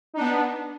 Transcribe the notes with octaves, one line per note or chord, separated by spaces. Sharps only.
B3 D4 D#4